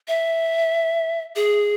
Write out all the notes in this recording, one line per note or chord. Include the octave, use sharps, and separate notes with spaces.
E5
G#4